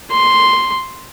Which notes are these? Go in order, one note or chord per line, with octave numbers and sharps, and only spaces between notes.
C6